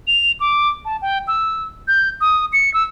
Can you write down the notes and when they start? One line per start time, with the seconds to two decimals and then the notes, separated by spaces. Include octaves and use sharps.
0.07 F7
0.40 D6
0.85 A5
1.02 G5
1.28 E6
1.88 G6
2.21 D#6
2.53 C#7
2.74 E6